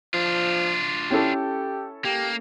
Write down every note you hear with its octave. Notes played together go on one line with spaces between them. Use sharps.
F3 D4 F4
C#4 E4 G4 A4
A#3 G4